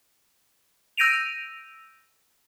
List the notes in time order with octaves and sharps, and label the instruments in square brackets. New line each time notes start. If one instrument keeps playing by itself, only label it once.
[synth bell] E6 G6 A#6 D7 D#7 F7